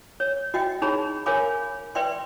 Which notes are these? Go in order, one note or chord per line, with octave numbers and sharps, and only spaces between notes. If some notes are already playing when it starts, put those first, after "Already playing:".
C#5
F#4 D#5 E5 G5
D#4 G#4 C#5 A#5 B5
A#4 C#5 F5 G#5 B5 D6
B4 D5 E5 G5 C6